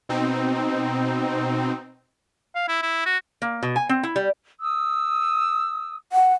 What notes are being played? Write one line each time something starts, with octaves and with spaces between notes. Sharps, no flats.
B2 C4 D#4
F5
E4
E4
F#4
A#3
B2
G#5
C4
E4
G3
D#6 E6
F#5